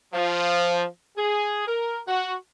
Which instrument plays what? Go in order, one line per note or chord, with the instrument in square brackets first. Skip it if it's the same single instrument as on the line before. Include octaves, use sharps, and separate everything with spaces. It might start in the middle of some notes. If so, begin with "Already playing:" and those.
[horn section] F3
G#4
A#4
F#4